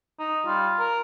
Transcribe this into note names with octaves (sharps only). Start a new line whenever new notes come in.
D#4
G3 F4
A#4